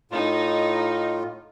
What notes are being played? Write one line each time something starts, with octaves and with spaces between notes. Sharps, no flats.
A2 D#4 F4